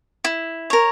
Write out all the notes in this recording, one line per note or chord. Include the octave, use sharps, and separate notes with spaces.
E4
A#4 C#5